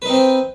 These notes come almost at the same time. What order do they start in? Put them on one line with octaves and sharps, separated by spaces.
B4 D#4 C4 C5